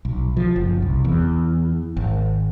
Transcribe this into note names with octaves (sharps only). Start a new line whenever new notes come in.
B1
F3
F#1
C2
E2
G#1